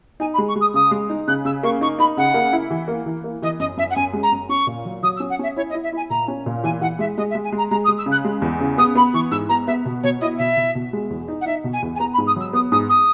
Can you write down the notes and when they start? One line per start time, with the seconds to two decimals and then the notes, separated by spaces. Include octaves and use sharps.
0.20 D#4 G#5
0.33 B5
0.38 G#3
0.48 C#6
0.56 G#3
0.61 D#6
0.74 C#3 D#6
0.91 G#3
1.09 D#4
1.28 C#3 F#6
1.45 C#3 E6
1.63 A#3 C#6
1.81 D#4 C#6
1.99 D#4 B5
2.17 C#3 F#5
2.34 A#3
2.53 E4
2.70 E3
2.88 A#3
3.06 E3
3.24 A#3
3.42 E3 D#5
3.59 F#2 D#5
3.77 F#2 E5
3.90 F#5
3.96 F#2 G#5
4.13 G#3
4.23 A#5
4.32 F#2
4.49 C#4 C#6
4.67 A#2
4.85 F#3
5.03 F#3 D#6
5.16 E6
5.20 C#4
5.30 F#5
5.39 C#4 E5
5.56 E4 C#5
5.69 D#5
5.74 E4
5.83 E5
5.92 E4 G#5
6.10 A#2 A#5
6.28 C#4
6.46 A#2
6.64 E3 G#5
6.81 E3 F#5
6.99 G#3 E5
7.17 G#3 D#5
7.30 E5
7.35 G#3
7.44 G#5
7.52 G#3 A#5
7.71 G#3 A#5
7.84 D#6
7.88 G#3
7.98 E6
8.06 C#3
8.11 F#6
8.25 G#3
8.42 E2
8.60 C#3
8.78 B3 D#6
8.95 B3 B5
9.14 E3 C#6
9.31 G#2 E6
9.49 B3 A#5
9.67 B3 E5
9.85 B2
10.03 B2 C#5
10.20 E4 D#5
10.38 B2 E5
10.57 B2
10.75 B2
10.93 G#3
11.10 E2
11.28 D#4
11.41 F#5
11.46 D#4 E5
11.64 B2
11.73 G#5
11.82 E2
11.95 G#5
11.99 B3 A#5
12.13 B5
12.18 G#2
12.27 D#6
12.36 F#3 E6
12.53 B3 D#6
12.71 G#2 D#6
12.89 D#6